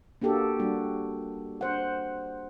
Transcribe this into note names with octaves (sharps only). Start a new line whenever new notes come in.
A#3 D4 F#4 G4 A4
G3 A#3 D4 F#4
D4 C5 F#5